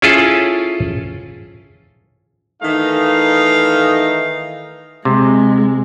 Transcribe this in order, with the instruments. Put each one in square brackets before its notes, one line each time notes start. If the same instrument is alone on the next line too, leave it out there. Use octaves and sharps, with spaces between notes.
[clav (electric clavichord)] C#4 E4 F4 G#4 A4
[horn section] D#3 E3 A3 D#4 F5
[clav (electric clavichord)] C3 [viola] G#3